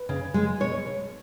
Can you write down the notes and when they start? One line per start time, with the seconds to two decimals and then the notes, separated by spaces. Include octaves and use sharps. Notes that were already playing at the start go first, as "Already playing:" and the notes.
Already playing: B4
0.09 C#3
0.34 G#3
0.60 B2 C#5